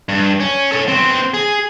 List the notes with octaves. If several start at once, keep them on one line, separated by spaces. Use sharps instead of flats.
G2
C#4
A4 C#5
B3 C4
G#4